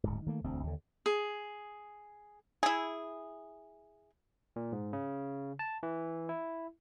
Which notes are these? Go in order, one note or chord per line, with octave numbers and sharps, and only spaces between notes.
D1 G#2
D#3 A3 A#3
E1 D2 C4
D#2 D3
G#4
E4 G#4
A#2
G#2
C#3
A5
E3
E4